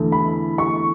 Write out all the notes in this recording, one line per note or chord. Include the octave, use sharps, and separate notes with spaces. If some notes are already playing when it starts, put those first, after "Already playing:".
Already playing: E2 D3 A3
B5
C#6